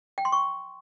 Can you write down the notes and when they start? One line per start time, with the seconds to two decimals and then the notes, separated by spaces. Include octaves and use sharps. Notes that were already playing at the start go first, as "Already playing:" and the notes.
0.18 G5
0.25 C6
0.32 C#6